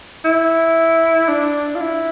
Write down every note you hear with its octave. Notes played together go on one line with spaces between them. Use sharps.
E4
D4
F4
E4